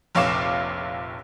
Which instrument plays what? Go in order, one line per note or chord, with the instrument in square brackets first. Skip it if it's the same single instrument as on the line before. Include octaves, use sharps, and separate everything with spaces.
[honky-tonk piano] F1 A#1 C#5 F5 D6 E7